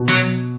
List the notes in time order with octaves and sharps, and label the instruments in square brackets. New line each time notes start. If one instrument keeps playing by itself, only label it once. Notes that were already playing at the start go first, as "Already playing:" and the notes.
Already playing: [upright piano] B2
[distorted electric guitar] F#3